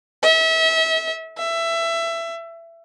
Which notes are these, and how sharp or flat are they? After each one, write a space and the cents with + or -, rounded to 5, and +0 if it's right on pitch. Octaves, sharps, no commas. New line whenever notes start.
E5 -35
E5 +20